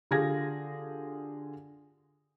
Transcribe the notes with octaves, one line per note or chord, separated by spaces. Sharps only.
D3 F4 G4 G#4 G#6 A#6